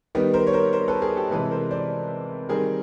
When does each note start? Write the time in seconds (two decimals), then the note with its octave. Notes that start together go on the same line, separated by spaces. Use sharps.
0.15 D#3 G3 B3
0.34 A#4 C5
0.47 C#5
0.53 A#4 C5
0.73 A#4 C5
0.88 A4 B4
1.02 G#4 A#4
1.17 G4 A4
1.31 C3 E3 G#3 A4 B4
1.51 A#4 C5
1.71 C5 D5
2.49 D#3 G3 C4 G#4 A#4